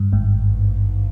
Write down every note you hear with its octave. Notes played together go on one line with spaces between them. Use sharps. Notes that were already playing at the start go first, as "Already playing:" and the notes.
Already playing: G2
G#1 G#2